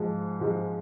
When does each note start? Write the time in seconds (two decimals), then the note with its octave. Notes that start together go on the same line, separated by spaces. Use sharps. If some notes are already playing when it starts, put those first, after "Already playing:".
Already playing: G#2 F3 G#3
0.40 G#2 F3 G#3